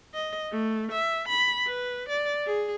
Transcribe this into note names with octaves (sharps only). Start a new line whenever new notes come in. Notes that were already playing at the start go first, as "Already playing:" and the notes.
D#5
A3
E5
B5
B4
D5
G#4